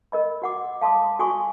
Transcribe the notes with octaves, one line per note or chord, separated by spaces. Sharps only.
A#4 D#5 B5
F#4 F#5 D6
F5 A5 C6 D6 D#6
F#4 G#5 C6 C#6 D#6